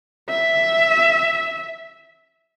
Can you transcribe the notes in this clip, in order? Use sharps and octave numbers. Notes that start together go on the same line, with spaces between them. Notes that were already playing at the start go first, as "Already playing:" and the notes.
E5